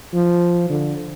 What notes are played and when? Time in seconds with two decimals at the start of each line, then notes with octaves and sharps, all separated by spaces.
0.14 F3
0.70 D3